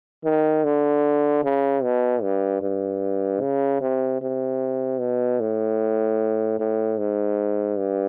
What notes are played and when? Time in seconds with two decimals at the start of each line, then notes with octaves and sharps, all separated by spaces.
0.24 D#3
0.64 D3
1.44 C#3
1.83 B2
2.23 G2
2.62 G2
3.41 C#3
3.81 C3
4.22 C3
5.00 B2
5.40 A2
6.60 A2
6.99 G#2
7.78 G2